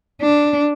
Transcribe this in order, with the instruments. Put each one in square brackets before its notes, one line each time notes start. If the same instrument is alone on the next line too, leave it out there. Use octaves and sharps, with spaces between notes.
[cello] D4